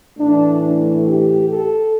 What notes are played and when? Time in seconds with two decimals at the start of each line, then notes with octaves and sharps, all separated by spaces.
0.18 A2 E3 A3 D4
0.62 D4
1.05 G4
1.49 A4